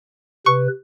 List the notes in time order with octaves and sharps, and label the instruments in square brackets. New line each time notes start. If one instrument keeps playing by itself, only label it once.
[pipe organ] C3 B4 [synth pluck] C#6